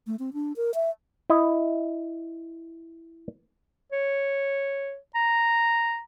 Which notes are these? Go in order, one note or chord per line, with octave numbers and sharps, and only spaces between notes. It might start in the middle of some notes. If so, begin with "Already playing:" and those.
A3
C4
D4
A#4
E5
E4 D#5
C#5
A#5